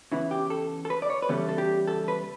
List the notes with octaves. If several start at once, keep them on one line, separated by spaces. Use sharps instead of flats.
C#3 E3 B3 E4
G4
A4
A4
B4
D5
C#5
B4
C#3 E3 G3 B3 A4
A4
G4
A4
B4